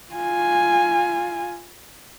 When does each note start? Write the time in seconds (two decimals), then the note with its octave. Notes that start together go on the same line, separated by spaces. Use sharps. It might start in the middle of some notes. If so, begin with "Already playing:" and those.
0.13 F4 G#5